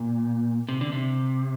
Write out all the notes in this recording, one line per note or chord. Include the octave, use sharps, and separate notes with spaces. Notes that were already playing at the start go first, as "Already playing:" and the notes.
Already playing: A#2
C3
D3
C3